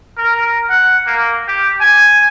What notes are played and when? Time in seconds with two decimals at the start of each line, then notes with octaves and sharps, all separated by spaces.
0.18 A#4
0.69 F#5
1.07 A#3
1.48 G4
1.81 G#5